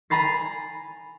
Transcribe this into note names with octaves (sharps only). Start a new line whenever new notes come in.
G#5 A#5 B5 A6 C7